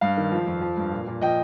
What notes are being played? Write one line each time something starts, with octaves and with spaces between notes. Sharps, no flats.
G2 F5
D#3
F3
F2
F3
G2
A#2
A#2
F3 D#5 G5